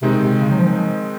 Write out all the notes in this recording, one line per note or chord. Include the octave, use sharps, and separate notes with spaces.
C3 D#3 G#3 C4 D#4
C3
C#3
F#3
F3